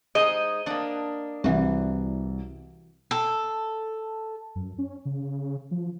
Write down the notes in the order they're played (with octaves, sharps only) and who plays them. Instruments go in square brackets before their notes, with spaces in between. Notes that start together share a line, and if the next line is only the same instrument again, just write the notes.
[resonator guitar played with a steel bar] G#3 D#4 [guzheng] C5 [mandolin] D#5
[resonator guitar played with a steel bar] A#3 D4 [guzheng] D5 F#5
[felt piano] C2 [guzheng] E3 F#4
[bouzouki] A4
[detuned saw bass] F#2
C#4
C#3
F3